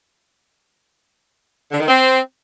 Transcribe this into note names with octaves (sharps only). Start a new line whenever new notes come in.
D3
D#3
C4